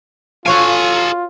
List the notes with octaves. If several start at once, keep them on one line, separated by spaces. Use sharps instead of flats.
F4 F#4 A4 C#5 F5 G#5